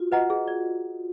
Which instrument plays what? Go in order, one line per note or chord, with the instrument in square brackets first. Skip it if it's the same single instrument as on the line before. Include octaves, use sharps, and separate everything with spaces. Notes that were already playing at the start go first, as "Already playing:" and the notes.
Already playing: [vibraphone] F4 F#4
[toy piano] B4 D#5 F#5 A#5
G#4
D5